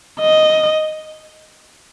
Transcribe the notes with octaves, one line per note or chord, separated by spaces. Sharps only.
D#5